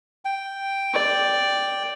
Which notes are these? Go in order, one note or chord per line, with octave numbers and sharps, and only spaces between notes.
G5
D5